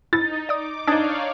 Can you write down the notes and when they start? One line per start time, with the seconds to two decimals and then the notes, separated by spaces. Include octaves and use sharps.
0.13 D#4 E4 A6
0.49 D5 D6 D#6
0.87 D4 D#4 C#5 D5 F5 D#6 G#6 A6